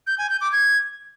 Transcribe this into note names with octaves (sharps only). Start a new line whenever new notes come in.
G6
G#5
G6
D6
G#6